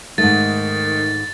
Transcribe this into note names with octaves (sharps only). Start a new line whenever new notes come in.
G#2 D#3 A3 A6